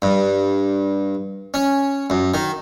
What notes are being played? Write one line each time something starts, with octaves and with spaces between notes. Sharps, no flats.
G2
C#4
F#2
D#3